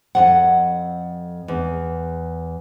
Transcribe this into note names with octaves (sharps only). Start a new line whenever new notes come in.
F2 E3 F#5
E2